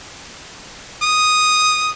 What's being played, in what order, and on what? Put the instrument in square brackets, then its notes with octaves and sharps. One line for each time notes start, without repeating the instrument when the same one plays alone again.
[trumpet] D#6